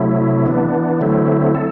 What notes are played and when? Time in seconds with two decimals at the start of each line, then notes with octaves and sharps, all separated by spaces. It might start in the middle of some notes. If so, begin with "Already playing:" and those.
Already playing: C3 F#3 A3 E4
0.46 E3 B3 D4
1.01 D3 F#3 A3 C4 E4
1.55 A4